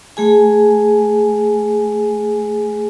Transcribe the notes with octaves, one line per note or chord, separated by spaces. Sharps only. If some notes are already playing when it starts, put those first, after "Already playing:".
A3 G#4 G#5